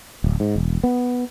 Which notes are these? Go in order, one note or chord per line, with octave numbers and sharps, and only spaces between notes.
D1
G#2
E1
B3